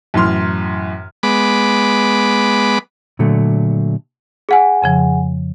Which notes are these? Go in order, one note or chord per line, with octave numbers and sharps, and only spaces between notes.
F#2 A2 E3 C6 F6
G#3 B3 B5 D6
A#2 D3 F#3 A3
G#4 F#5 G#5
F2 C#3 F3